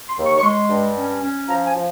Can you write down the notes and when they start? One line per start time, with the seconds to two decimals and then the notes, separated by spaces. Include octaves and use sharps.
0.08 C6
0.17 D#2
0.25 C#6
0.38 C#6
0.43 G#3 C6
0.69 G2
0.95 C#4
1.22 C#4
1.48 F3 A#5
1.66 G#5
1.75 F3